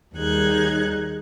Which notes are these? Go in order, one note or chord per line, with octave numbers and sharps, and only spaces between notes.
D#2 G3 D#4 G#4 F#6 G#6